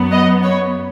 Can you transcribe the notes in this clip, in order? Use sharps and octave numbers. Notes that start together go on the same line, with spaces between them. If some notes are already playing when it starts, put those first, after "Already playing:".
Already playing: F#2 F#3 B3
D#5
C#5